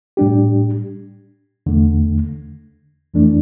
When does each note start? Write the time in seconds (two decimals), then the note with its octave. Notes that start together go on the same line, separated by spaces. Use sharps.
0.17 A2 G3 D4 G4
1.66 E2 D3 A3
3.14 F2 E3 A3 D4